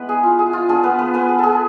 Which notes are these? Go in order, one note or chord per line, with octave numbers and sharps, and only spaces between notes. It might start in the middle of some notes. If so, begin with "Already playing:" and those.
Already playing: G#3 B3 E4 B4
G#4
F4
G#4
F4
B3 D4 F4 G#4
B3 B4
B3 B4
B3 B4
G#4
G#4 A4